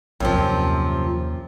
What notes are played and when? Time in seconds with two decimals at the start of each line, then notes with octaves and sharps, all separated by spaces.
0.20 A#1 F#2 C3 F3
0.34 D#2